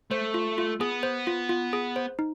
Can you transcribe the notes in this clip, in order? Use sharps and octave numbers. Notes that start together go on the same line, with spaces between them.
A3 C5
F4
F4
B3 G#4
C5
F4
F4
G#4
C5
D#4